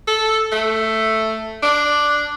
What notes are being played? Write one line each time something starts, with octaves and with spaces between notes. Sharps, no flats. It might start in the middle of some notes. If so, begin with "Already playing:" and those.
A4
A3
D4